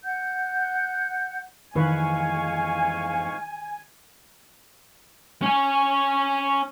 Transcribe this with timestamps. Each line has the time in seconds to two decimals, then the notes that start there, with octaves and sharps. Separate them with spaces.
0.04 F#5 G6
1.75 F2 G#2 D#3 E3 B4 F5 G#5 C#6
5.42 C#4 G#5